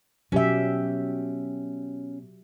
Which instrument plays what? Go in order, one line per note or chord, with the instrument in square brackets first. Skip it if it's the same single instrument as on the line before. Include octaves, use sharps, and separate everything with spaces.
[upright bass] B2 [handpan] F#3 G4 E5 [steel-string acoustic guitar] C#4 G5